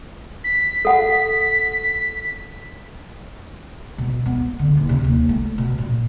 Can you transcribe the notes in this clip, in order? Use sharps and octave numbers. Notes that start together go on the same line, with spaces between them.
B6
A4 F#5
B2
B3
D3
D#1
C3
D#2
A3
B2
A#2